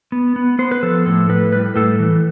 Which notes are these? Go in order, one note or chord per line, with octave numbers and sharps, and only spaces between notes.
B3
B3
B3 C5
B4
F3 A4
A2 A4
A2 B4
G3 B4
A2 A4
E3